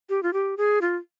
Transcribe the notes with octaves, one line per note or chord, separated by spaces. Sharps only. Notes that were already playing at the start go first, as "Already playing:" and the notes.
G4
F4
G4
G#4
F4